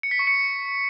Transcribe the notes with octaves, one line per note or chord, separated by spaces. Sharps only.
C#7
B6
C#6
C#7